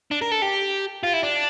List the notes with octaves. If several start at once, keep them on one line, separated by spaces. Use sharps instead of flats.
D4
A#4
A4
G4
F4
E4
D4